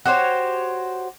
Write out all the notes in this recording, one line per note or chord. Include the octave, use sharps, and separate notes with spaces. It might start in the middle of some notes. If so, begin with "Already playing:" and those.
F#4 G4 C5 C#5